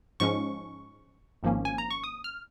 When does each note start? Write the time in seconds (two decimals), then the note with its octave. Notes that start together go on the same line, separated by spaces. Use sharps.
0.20 G#2 F3 G#3 C#4 C#6
1.43 G#1 G#2 F3 A#3 C#4
1.65 G#5
1.78 A#5
1.91 C#6
2.04 D#6
2.24 F6